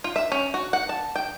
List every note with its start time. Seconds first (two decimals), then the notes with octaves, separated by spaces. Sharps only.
0.04 F4
0.16 E5
0.32 C#4
0.54 F#4
0.73 F#5
0.89 A5
1.16 G5